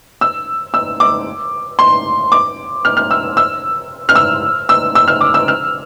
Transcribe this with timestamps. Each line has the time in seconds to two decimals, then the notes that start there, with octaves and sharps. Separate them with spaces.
0.21 E6
0.74 E6
1.00 D6
1.79 C6
2.32 D6
2.85 F6
2.97 F6
3.11 E6
3.37 E6
4.09 F6
4.15 E6
4.69 E6
4.95 E6
5.08 F6
5.21 D6
5.34 E6
5.48 F6